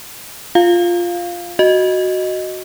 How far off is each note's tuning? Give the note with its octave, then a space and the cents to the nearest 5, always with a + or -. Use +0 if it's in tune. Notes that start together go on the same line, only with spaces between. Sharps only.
F4 +0 F5 +0
F#4 +0 D#5 +0